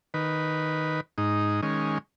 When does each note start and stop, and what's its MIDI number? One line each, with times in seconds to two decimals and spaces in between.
0.14 1.00 51
0.14 1.00 71
1.18 1.61 44
1.18 1.61 63
1.63 1.98 51
1.63 1.98 56
1.63 1.98 61